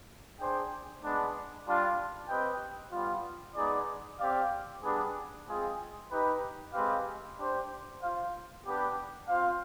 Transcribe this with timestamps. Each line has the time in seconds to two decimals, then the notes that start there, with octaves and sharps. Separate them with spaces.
0.38 D4 G#4 C5 G5
1.01 G#3 B3 D4
1.65 G3 D4 F4
2.28 C4 G4 B4 D#5 G5
2.92 G3 B3 F4
3.56 G#3 B3 D#4 G#4 D5
4.19 C4 G4 D5 F5
4.82 G3 B3 D4 G#4 B4
5.46 G#3 C4 F4 G#4
6.10 D#4 G4 B4
6.73 G#3 C4 G4 B4 F5
7.37 D4 G4 C5
8.01 F4 C5 F5
8.64 B3 D4 G4 B4
9.28 C4 F4 C5 F5